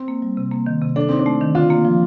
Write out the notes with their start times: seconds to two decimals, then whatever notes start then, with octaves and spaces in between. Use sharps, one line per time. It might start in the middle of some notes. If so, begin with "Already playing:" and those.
Already playing: C4
0.08 A#3
0.22 G3
0.37 C3
0.52 A#3
0.66 D#3
0.82 C3
0.96 D4 A4
1.09 C4 D#4
1.19 D4
1.26 A3
1.41 D#3
1.55 D3 F4
1.70 A#3
1.85 F3